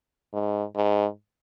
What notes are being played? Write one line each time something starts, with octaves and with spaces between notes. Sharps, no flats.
G#2
G#2